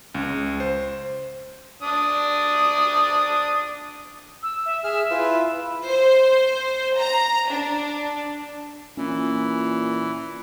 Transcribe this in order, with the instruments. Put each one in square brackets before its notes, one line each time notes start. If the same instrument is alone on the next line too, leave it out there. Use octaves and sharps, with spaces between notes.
[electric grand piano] C#2
C5
[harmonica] D4 D#6
[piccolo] E6
E5
[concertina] G#4 F6 [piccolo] E5
[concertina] E4 F4 B4
[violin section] C5
A#5
D4
[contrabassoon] A#2 [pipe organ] E3 [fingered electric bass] C#4